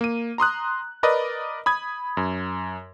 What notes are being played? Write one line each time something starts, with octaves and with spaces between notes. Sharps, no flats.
A#3 D#7
A#5 C6 D#6 F#6
A#4 B4 D5 D#5
B5 D#6 G#6
F#2